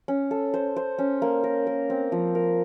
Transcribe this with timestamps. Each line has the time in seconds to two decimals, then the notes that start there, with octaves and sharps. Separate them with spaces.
0.08 C#4
0.31 A4
0.54 C5
0.76 C5
0.99 C#4
1.22 A#3
1.44 A#4
1.67 A#4
1.90 C4
2.12 F3
2.35 A#4